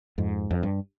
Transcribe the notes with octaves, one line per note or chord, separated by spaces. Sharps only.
F2 G#2
F2
G2